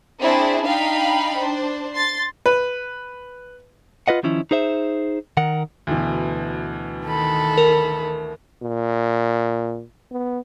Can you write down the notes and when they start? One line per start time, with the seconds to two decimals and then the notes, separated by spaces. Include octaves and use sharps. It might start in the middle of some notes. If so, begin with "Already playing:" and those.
0.22 C4 D4 E4 G#4
0.65 D4 D#4 F5 G5 B5
1.38 D4 C5
1.94 C6 A6
2.46 B4
4.08 F4 B4 D#5 F#5
4.23 D#3 F3 C#4 E4
4.51 D#4 G#4 C5 E5
5.37 D#3 A#4 F#5
5.87 D2 B2 E3
7.03 D#3 A4 B5
7.58 A#4
8.63 A#2
10.12 B3